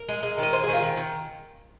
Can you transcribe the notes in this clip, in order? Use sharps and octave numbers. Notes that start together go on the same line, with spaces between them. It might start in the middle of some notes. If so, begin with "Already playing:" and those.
Already playing: A#4
G#3
G#3
D#3 D#5
G#3 C5
G#4
D#3
F4
D#3
D#3